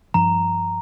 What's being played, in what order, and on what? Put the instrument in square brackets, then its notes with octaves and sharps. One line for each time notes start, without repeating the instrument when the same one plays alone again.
[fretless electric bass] G2 F3 [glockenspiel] A#5